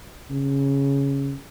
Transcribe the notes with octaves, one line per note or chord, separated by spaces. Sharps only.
C#3